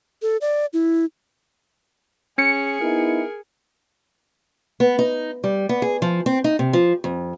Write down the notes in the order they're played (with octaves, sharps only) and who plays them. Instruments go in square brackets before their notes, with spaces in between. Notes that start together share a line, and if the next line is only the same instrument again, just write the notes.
[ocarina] A4
D5
E4
[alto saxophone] C#4 [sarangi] G#4 [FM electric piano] C#7
[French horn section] B3 D#4 E4 [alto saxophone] A#4
[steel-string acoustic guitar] B3
D#4
G3
B3
G#4
F3
C4
D#4
C3
F3
F2